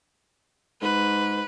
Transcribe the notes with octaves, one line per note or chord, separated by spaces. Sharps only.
G#2 B4